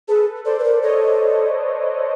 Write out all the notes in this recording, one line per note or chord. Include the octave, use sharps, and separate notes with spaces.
G#4 A4 B4
A4 C5 D5
B4
A#4
A4 C#5 D#5